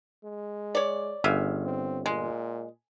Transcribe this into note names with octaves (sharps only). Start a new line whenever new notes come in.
G#3
C#5 D5
G1 C#3 E5 F5
C4
A#2 G#3